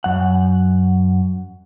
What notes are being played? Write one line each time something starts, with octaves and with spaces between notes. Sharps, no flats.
F#2 F#5